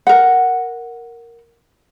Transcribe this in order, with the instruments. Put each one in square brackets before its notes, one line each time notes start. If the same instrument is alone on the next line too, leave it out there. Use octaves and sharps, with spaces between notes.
[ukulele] A#4 F#5